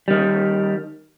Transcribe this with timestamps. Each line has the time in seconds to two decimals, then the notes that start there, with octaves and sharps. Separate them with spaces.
0.08 D#3 G3